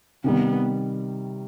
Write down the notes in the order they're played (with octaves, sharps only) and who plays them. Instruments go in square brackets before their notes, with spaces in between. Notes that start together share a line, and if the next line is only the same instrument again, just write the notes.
[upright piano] C3 D#3 G3 [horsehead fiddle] B3